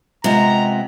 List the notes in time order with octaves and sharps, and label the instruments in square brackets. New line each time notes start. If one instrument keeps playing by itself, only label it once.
[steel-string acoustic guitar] C3 B3 [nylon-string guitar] G#3 F4 D#5 [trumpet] A#5